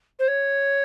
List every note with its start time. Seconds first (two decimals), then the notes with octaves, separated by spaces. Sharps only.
0.19 C5
0.28 C#5